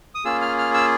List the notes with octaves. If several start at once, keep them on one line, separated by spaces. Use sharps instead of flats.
D#6
A#3 C#4 F4 G#4 E6
F6
F6
E6